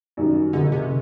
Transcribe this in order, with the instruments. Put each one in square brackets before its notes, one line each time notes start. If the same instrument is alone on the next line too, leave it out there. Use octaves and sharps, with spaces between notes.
[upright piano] F#2 D#3 G3
[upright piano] F#1 [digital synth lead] D3
[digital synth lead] C3